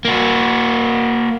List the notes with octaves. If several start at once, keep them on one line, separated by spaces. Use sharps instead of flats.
A#3 F#4